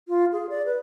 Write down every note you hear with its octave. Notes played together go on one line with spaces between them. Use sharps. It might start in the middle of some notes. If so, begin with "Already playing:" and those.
F4
G#4
D5
B4